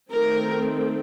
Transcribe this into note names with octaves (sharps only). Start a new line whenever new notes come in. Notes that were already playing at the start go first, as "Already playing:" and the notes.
D#3 A3 C4 A#4